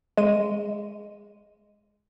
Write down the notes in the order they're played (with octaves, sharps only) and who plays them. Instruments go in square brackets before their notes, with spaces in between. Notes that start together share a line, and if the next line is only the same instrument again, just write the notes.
[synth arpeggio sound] G#3 D#7